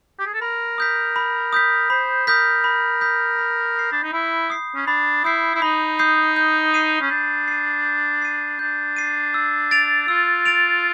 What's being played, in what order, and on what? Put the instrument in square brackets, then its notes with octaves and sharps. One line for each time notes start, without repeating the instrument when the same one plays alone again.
[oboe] G4
G#4
A4
[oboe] A#4 [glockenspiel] B5
[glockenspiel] D#6 G6 B6
B5
D#6 G6 B6
[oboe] C5 [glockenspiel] B5
[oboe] A#4 [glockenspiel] D#6 G6 B6
[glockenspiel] B5
D#6 G6 B6
B5
D#6 G6 C7
[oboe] D4
D#4
[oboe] E4 [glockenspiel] B5
[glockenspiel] D#6 G6 C7
[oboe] C#4
[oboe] D4 [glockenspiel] B5
[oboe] E4 [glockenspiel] D#6 G6 C7
[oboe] E4
[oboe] D#4 [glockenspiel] B5
[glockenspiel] D#6 G6 C7
G6
C7 D#7
[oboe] C#4
[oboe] D4 [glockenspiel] G6
[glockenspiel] C7 D#7
G6
C7 D#7
[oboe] D4 [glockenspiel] G6
[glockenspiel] C7 D#7
E6
A6 D7 F7
[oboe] F4 [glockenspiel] E6
[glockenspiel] A6 D7 F7